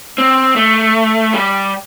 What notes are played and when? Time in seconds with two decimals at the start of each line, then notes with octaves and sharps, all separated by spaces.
0.18 C4
0.56 A3
1.34 G3